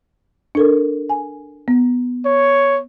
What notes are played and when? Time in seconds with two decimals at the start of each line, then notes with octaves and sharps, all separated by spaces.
0.55 D4 A4 A#4
1.10 G#5
1.68 B3
2.26 C#5